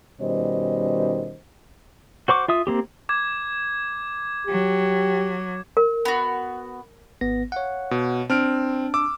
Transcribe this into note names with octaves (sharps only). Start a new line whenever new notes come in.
B2 D#3 G3 C#4 C5 D#5
F#4 C5 C#6 D6
F4 E5 D#6
A#3 C4 G4
D6 G#6
F#3 G4
A#4
B3 F#4
G#1 B3 A#6
C#5 F5 F#5
B2
C4 D4 A5 F6 D7
D6 E6